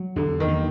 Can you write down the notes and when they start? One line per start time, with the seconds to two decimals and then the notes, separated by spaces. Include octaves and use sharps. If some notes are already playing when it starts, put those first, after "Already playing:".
Already playing: F#3
0.16 E2 D3
0.40 D#3
0.48 A#3